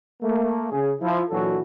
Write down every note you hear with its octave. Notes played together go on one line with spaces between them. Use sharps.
A3 A#3
C#3 G#4
F3 E4
A#2 E3 F#3 D4 F#4 A4